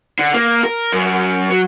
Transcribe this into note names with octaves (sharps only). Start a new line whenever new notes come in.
D3
A#3
A#4
F#2
F#3